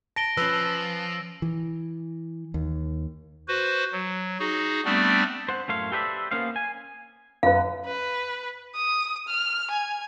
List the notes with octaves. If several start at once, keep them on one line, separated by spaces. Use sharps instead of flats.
A5 A#6 D7 G7
F3 C#4 B4 E6
E3
D#2
F#4 B4 C5
F#3
D#4 F#4 G#4
G3 A3 B3 C4 D4 D5
C5 F#5
F#2 A2 A3 C#5 F5 C6
G4 A4 B4 C5 D5 E5
A#3 B3 C#4 C5 F5
G#5
F#2 B4 F5
B4
D#6
F6
G#5